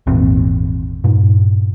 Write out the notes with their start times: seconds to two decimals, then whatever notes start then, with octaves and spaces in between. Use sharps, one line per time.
0.07 G#1 E2 A#2 C4
1.04 G2 A#2